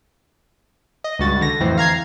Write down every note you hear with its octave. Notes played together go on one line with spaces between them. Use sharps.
D#5
C#2 G2 F#4 A6
D3 A#6
F2 A2 E3 C4
F5 A#5 G#6 C7